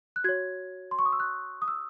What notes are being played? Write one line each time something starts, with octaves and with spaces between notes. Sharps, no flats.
F#6
F#4 C#5 G#6
C6
C#6
D#6
E6
F#6
D#6
E6